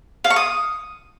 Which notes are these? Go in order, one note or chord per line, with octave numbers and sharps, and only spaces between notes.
F5
C#6
D#6